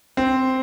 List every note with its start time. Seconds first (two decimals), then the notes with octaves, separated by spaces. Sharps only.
0.17 C4